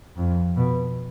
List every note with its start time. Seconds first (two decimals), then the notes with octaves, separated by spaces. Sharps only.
0.17 F2
0.56 B2